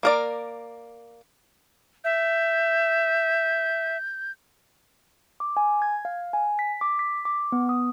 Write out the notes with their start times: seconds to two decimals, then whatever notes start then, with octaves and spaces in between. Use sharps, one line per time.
0.03 A#3 A#4 D5
2.04 E5 G6
5.40 D6
5.57 G#5
5.82 G#6
6.05 F5
6.33 G#5
6.59 B6
6.81 D6
6.99 B6
7.25 D6
7.52 B3
7.69 D#6